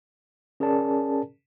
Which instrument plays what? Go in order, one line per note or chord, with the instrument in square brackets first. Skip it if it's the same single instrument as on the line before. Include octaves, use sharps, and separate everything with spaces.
[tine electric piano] C#4 G#4 A#4 D5 A5